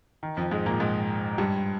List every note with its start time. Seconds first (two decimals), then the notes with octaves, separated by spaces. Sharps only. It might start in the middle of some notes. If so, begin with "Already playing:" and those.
0.23 D#3
0.37 F2 F3
0.51 G#2 G#3
0.66 A#2 A#3
0.80 G#2 G#3
1.38 G2 G3